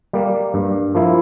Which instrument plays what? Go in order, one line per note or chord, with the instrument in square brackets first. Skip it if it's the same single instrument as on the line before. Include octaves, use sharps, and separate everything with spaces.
[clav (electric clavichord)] G3 A#3
G2
F3 A#3 E4